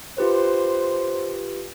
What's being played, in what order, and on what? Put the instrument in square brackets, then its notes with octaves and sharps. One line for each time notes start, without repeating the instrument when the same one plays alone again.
[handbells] F4 G4 B4 [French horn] C5